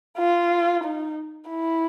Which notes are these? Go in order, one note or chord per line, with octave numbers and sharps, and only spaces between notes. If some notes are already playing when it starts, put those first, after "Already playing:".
F4
D#4
E4